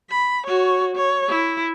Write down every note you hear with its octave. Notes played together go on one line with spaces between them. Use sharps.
B5
F#4 C#5
C#5
E4